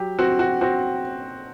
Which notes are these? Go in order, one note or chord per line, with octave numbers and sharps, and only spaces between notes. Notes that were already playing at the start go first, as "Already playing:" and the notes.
Already playing: F#3 G4
C4 F#4
F#4
C4 F#4